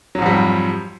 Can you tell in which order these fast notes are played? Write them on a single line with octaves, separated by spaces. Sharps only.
F#3 G#2 F2 G3